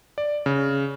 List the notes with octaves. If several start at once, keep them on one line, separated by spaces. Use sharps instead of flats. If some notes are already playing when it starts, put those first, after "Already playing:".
D5
C#3